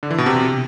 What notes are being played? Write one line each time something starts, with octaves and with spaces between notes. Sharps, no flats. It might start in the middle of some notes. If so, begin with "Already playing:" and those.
D3
E3
B2
C3